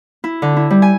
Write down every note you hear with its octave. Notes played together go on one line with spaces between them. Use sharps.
E4
D3
E4
G3
G#5